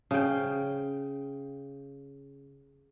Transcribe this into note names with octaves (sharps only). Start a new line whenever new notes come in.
C#3 G5